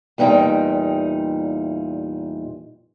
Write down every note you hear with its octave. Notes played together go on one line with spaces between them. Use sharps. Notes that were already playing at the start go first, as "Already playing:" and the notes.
E2 A#2 G3 D#4 G5